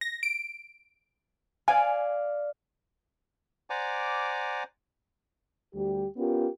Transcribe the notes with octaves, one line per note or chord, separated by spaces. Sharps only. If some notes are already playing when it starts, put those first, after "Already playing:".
A#6
D7
D5 F5 G#5
C5 D5 F#5 G#5 A#5 D6
D2 G3 G4
B3 C#4 F4 G4 A#4